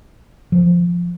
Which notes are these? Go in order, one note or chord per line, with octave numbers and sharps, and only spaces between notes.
F3